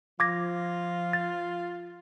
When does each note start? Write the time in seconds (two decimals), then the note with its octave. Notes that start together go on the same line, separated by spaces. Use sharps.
0.20 F3 F4 D6 G#6 A#6
1.13 A6